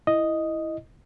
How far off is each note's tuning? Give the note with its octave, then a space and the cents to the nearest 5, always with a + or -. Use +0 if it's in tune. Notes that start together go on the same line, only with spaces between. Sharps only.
E4 +0 D#5 +0